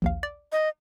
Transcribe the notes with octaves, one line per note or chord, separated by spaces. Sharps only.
A#1 D#2 F5
D5
D#5